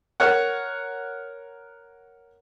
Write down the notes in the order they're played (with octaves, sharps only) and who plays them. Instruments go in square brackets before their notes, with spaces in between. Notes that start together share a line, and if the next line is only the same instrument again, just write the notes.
[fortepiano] A#4 C#5 F#5